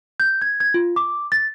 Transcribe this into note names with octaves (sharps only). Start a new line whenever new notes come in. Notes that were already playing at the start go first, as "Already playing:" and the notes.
G6
G#6
G#6
F4
D6
A6